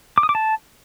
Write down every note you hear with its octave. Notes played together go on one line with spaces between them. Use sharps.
D6
D#6
D6
A5